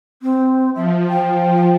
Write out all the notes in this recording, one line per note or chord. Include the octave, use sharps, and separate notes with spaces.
C4
F3 E5
G5